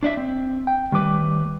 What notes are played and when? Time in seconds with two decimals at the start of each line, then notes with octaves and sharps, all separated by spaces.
0.03 D4 D5 E5
0.17 C4
0.67 G5
0.92 D#3 G3 A3 B4 D6